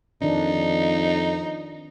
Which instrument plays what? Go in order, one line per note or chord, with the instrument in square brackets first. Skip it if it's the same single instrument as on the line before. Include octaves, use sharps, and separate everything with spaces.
[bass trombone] F2 [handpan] D#3 D4 [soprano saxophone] D#4